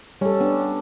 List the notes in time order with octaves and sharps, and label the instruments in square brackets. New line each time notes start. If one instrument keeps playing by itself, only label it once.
[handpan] G3 A4 [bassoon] C#4
[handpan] B3 D4